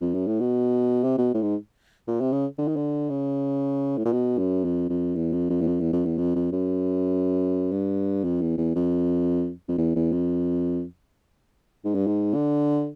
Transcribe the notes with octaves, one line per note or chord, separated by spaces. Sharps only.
F2
F#2
A2
B2
C3
B2
A2
G#2
A#2
C3
C#3
D3
D#3
D3
C#3
A2
A#2
B2
F#2
F2
F2
E2
F2
F2
E2
F2
E2
F2
E2
F2
F2
F#2
G2
F2
E2
E2
F2
F2
E2
E2
F2
G#2
G2
G#2
D3